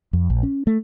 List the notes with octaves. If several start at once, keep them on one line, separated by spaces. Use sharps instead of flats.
F2
A#1
C#4
A3